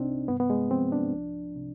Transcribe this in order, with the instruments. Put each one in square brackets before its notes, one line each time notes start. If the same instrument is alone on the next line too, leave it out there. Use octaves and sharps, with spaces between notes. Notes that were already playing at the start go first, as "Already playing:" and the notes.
Already playing: [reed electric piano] C2 C3 C4 D4 D#4
G2 B3
B3
G#3
F3 C4
D4
C2
C3